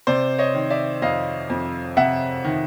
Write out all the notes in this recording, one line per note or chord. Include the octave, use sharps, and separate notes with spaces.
C3 C5 D5
C#5 D#5
D#3
D5 E5
F2 D#5 F5
F2
C3 E5 F#5
D#3